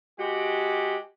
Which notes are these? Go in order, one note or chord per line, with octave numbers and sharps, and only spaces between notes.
G#3 F#4 G4